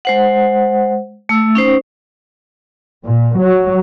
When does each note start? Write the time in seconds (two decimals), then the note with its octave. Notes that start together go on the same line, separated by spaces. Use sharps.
0.05 G#3 C5 F#5
1.29 A3 E6
1.55 C#4 D#4 C5
3.06 A#2
3.38 F#3